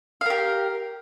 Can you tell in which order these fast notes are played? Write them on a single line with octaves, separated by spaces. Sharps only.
F5 A#4 G4